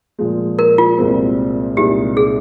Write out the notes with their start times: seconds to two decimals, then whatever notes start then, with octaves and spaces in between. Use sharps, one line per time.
0.19 A#2 F3 G#3
0.59 A#4
0.78 F4
0.98 C2 A#2 G#3 C4
1.77 C2 A#2 G#3 D#4 G4
2.17 G#4